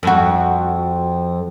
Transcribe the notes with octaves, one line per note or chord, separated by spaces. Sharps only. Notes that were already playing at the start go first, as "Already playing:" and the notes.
F2 F#4